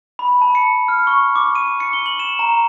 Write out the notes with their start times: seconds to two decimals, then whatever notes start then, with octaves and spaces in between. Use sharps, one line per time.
0.19 B5
0.41 A5
0.55 C#7
0.88 F6
1.07 C#6
1.36 D6
1.55 D#7
1.80 C#7
1.93 G7
2.06 F#7
2.19 E7
2.39 A#5